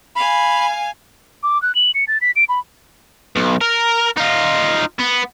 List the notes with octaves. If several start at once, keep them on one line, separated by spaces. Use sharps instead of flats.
F5 G#5 B5
D6
F#6
F#7
C#7
A6
B6
D7
B5
B1
A#4
D#4 F4
B3